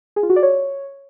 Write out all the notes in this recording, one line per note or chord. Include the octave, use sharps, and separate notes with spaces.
G#4
F4
F#4
D5
C#5